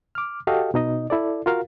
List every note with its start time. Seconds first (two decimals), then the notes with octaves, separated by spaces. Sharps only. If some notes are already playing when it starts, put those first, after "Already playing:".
0.15 D6 F6
0.47 F#4 G4 A4 D#5 F5 G5
0.74 B2 D#4 D#5
1.10 E4 A4 D5
1.46 F4 F#4 A#4 F5